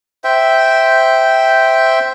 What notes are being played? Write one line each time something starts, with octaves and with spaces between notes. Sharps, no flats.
C5 E5 G5